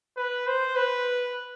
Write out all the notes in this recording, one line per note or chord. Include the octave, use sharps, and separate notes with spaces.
B4
C5
B4